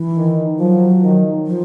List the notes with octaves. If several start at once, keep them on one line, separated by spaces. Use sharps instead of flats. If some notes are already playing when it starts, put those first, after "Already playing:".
Already playing: E3
D#3
F3 F#3
D#3
F3